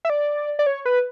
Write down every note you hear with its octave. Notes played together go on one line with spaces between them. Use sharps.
E5
D5
D5
C#5
B4